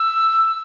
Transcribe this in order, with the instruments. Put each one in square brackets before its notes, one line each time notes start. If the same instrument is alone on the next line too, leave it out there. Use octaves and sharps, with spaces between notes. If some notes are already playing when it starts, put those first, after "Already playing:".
Already playing: [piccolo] E6